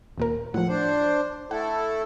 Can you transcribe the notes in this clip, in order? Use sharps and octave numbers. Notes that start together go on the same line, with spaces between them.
D#2 A#2 A#4
A2 F3 F#5
D4 C5
A3 E4 A4 F#5